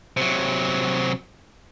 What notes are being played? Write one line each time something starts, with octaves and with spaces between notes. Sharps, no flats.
C3 F#3